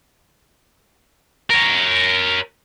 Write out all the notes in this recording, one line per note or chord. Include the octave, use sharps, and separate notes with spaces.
A#4 C#5